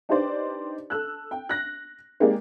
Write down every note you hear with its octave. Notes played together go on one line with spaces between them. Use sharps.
D4 D#4 G4 B4 C5 D5
A4 E6 F#6
G5
F#6 A#6
G#3 A#3 D#4 G4 G#4 D5